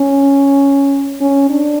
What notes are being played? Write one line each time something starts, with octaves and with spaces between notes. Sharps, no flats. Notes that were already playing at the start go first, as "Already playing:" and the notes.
Already playing: C#4
C#4
D4